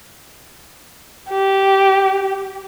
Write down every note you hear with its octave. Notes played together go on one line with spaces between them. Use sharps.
G4